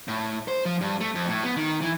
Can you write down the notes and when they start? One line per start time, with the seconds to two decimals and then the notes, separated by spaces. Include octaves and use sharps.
0.08 A2
0.48 C5
0.65 F3
0.81 G2
1.01 A3
1.15 F2
1.28 A2
1.44 B3
1.56 D#3
1.81 E3